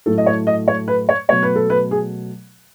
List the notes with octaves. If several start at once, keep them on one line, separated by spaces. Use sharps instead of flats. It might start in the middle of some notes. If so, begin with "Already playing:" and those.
A2 F#3 A3 A4
D#5
C#5
D#5
C#5
B4
C#5
B2 F#3 A3 C#5
B4
A4
B4
G#4